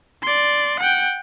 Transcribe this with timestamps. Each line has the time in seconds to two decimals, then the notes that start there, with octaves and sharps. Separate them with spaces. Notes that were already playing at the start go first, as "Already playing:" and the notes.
0.23 D5 C6
0.80 F#5 G5